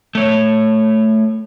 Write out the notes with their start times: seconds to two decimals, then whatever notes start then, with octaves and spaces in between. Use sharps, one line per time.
0.15 A3 C#5